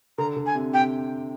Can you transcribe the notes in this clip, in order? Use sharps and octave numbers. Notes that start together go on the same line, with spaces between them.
D3 A#5
D3
G#5
C3
C3 G5